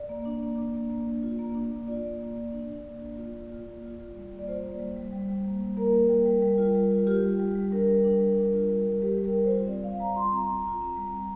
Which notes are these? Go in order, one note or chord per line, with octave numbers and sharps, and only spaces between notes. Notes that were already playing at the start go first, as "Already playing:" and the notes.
Already playing: D5
A#3
D4
A#3
D4
A#3
A#3
A#3
F4
A#3
D4
A#3
F4 D5
A#3
A#3
A#3
D4
D4
A#3
A#3
F4
A#3
F4
A#3
F4
F4
G3
A#3
D5
F4 C5
A#3
G3
G3
G3
G3
A#3
G3
A#3 A#4
A#3
G3
G3
G3
F4
G3
F4
F4 G4
G3
G3
G3
D4 A#4
G3
D4
G3
G3
F4
G3
G3
G3 G4
G3
A#4
G3
C5
F4
C4 D5
G3 F5
G3 A#5
F4 C6
C4 A#5
C4
F4
C4
G3
C4